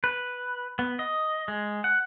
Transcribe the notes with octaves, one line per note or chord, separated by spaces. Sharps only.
B4
B3
D#5
G#3
F#5